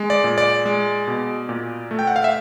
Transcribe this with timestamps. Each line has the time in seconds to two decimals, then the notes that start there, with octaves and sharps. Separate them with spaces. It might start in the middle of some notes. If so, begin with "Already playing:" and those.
Already playing: G#3
0.10 D5
0.24 A#2
0.38 D5
0.65 G#3
1.08 B2
1.49 A#2
1.91 A3
1.99 G5
2.07 F#5
2.16 F5
2.24 E5